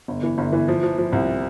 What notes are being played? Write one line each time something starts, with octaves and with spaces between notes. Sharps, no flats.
G1
E3
G1
E3
F3
F3
F3
C2